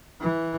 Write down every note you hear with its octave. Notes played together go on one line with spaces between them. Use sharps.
E3